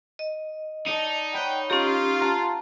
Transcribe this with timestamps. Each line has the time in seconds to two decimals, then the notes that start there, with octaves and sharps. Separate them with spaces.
0.19 D#5
0.87 D#4 D5 A5 C#7
1.34 C#5 F#5 G5 B5
1.70 C#4 F4 G4 A#4
2.20 F#5 A5 A#5